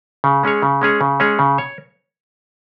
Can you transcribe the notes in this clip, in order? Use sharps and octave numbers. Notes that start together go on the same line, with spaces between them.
C#3
G#3 C#4 G#4 C#5
C#3
G#3 C#4 G#4 C#5
C#3
G#3 C#4 G#4 C#5
C#3
C#5